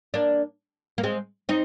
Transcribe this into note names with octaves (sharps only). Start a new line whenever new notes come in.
A#3 D4
A#3
G#3 C4
C4 D#4